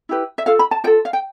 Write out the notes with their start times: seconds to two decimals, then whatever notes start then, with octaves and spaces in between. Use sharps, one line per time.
0.09 E4 G4 B4
0.38 E5
0.46 F4 A4 F5
0.59 B5
0.71 A5
0.84 F4 G5
0.87 A4
1.05 F5
1.13 G5